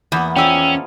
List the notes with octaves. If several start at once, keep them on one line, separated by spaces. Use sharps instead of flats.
E2 A#3 B3
F3 C#4 G#4 D5 G5 E6